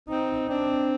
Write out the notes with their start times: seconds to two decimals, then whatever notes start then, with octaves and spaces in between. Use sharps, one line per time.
0.08 C4 D#4
0.49 C4 D4